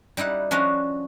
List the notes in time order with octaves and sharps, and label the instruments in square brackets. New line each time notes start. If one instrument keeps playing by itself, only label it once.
[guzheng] G3 D#4 E4 F#5
F3 C#4 D4 F#4 D#5 F5